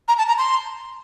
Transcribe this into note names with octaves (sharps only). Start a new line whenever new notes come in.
A#5
A5
A#5
C6